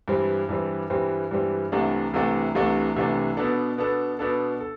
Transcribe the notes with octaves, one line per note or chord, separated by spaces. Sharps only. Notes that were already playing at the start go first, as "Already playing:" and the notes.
G2 E3 G3 C4
G2 E3 G3 C4
G2 E3 G3 C4
G2 E3 G3 C4
C2 C3 E3 A3 D4
C2 C3 E3 A3 D4
C2 C3 E3 A3 D4
C2 C3 E3 A3 D4
B2 B3 D4 A4
B2 B3 D4 A4
B2 B3 D4 A4
A4